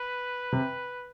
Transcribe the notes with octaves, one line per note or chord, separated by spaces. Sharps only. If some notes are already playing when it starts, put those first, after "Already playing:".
Already playing: B4
C3